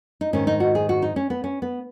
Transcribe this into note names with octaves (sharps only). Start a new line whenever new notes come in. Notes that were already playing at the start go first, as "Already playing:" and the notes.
D#4
G#2 D#3 C#4
D#4
F#4
G#4
F#4
D#4
C#4
B3
C#4
B3